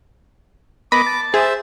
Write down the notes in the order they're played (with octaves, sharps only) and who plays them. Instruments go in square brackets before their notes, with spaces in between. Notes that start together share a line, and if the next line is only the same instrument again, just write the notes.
[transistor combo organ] B3 A#4 D#5 [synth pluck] B5 [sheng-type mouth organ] D6
[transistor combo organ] A5
[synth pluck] G#4 [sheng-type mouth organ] C5 E5